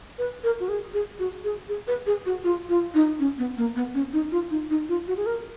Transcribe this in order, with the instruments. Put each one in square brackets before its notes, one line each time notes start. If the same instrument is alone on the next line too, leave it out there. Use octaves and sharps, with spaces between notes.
[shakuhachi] B4
A#4
F#4
G#4
G#4
F#4
G#4
G#4
B4
G#4
F#4
F4
F4
D#4
C#4
B3
A#3
B3
C#4
D#4
F4
D#4
D#4
F4
F#4
G#4
A#4